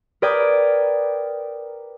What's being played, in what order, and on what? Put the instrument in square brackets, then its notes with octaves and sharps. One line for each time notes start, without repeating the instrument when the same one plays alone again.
[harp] A#4 B4 D5 G5 D#6 G#6